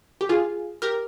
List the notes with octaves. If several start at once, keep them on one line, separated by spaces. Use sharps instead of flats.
G4
F4 G#4
G4 A#4